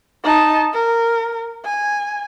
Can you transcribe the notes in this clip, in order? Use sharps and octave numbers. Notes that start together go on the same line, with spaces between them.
D#4 A5
A#4
G#5